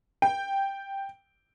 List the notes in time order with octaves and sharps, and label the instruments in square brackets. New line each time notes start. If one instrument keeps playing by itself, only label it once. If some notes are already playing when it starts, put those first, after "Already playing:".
[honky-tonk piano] G5